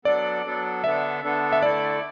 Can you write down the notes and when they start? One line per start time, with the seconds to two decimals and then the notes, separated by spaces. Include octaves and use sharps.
0.05 F#3 B3 D4 A4 D5
0.45 F#3 B3 D4 A4
0.84 D3 B3 D4 A4 E5
1.24 D3 B3 D4 A4
1.52 E5
1.62 D3 A3 E4 A4 D5